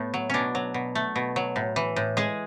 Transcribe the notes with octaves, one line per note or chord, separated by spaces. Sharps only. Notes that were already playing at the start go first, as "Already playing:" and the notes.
Already playing: A2 A3 B3
F#3
B2 C#4 D4
F#3
B2
A3
B2
F#3
A2
E3
A2
G#3 G#4